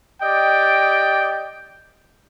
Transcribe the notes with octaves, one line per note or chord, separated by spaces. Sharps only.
G4 D5 D#5 G5